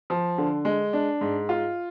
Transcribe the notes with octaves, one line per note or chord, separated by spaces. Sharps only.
F3
D3
G#3
D4
G#2
F4